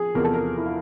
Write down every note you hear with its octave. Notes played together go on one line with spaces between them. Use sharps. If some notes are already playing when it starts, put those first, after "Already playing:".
Already playing: F3 G#4
E2 C3 F3 A#4
A4
A#4
E4
F4